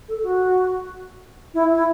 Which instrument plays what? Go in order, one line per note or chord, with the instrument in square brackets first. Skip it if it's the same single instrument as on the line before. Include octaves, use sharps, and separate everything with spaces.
[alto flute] A4
F#4
E4
E4